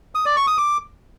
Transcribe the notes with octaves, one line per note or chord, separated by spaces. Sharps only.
D#6
D5
C#6
D#6
D6